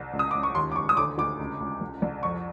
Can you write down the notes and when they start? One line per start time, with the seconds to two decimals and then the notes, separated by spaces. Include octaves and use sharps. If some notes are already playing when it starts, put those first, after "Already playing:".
Already playing: C2
0.13 C#2
0.19 D#6
0.31 C#2 D6
0.43 C#6
0.55 D#2 C6
0.72 D6
0.76 D#2 C#6
0.89 D#6
0.97 D2 D6
1.18 D2 D6
1.39 C#2
1.60 C#2
1.81 C2
2.02 C2
2.23 F2 C#6